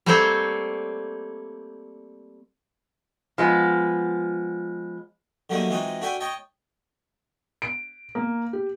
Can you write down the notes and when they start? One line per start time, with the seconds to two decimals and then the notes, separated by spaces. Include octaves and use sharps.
0.06 G3 A3 A#3 C4 C5 C#5
3.38 F3 G#3 B3
5.50 D3 F#3 G3 A3 A#3 D#4
5.69 E3 G#3 C4 D#4 F4 F#4
6.01 D4 F#4 A4 E5 G5 G#5
6.20 C#5 D#5 G5 A5
7.62 D7
8.15 A#3
8.53 G4